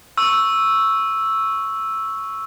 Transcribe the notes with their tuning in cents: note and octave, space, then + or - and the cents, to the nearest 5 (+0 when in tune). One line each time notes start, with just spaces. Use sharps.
C#6 +0 E6 +0